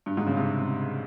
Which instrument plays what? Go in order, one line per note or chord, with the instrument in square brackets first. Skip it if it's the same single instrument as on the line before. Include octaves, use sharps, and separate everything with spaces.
[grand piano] G2
G#2
C#3
C3